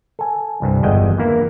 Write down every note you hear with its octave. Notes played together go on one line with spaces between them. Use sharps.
A4 G#5
C2 G2
G1 E2 G#3 D5 D#5 G5
D3 E3 A#3 E4